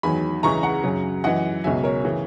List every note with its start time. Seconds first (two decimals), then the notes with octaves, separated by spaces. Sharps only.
0.03 E2 D#3 F#3 G#5 B5
0.43 C#2 C#3 E3 A#5 C#6
0.63 F#5 A#5
0.83 F#2 C#3 F#3
1.24 F#2 E3 D#5 F#5
1.64 C#2 B2 F#3 E5 G#5
1.84 A#4 C#5
2.05 C#3 E3